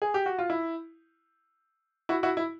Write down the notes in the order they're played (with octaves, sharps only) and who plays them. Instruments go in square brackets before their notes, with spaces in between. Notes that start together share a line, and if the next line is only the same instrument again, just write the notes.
[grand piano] G#4
G4
F#4
F4
E4
E4 F#4
E4 F#4
E4